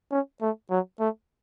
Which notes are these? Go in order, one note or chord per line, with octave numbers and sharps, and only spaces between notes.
C#4
A3
F#3
A3